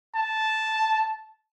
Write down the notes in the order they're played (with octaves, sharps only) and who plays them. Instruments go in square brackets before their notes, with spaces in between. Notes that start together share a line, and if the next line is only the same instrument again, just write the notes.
[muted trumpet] A5